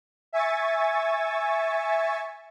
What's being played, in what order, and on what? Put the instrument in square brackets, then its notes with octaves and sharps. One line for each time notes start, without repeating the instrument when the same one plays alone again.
[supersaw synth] E5 G#5 C#6 A6